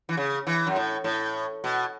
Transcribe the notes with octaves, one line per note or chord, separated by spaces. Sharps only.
E3
C#3
E3
F#2
A2
A2
B2